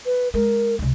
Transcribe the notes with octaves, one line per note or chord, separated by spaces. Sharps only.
B4
G#3 A#4
C#2 C3